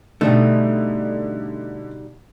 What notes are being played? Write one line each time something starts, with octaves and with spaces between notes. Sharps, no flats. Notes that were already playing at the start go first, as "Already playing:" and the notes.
B2 D3 G3 A3 D#4